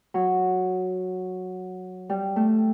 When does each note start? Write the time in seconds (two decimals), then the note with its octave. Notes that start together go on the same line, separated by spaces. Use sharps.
0.14 F#3
2.10 G3
2.36 A3